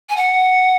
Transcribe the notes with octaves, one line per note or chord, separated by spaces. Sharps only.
G#5
F#5